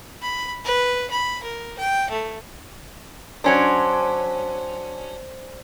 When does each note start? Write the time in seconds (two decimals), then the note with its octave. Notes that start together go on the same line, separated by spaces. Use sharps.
0.22 B5
0.65 B4
1.11 B5
1.43 A#4
1.79 G5
2.10 A3
3.44 F#3 C#4 D4 C5 D5 G#5